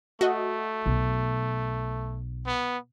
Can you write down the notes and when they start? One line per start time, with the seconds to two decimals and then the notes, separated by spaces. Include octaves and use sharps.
0.21 A3 F#4 D#5
0.86 B1
2.47 B3